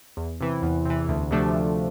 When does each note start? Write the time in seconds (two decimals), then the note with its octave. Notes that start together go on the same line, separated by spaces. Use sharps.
0.17 E2
0.41 C3 E3
0.62 E2
0.85 C3 E3
1.09 D2
1.31 C3 F3 A3 D4
1.54 D2